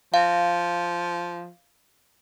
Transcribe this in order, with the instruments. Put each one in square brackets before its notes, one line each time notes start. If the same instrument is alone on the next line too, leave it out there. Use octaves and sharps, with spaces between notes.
[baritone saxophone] F3 [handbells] F5